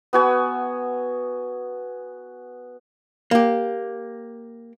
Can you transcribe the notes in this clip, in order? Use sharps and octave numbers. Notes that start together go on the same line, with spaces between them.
B3 F#4 G#5 E6
A#3 G4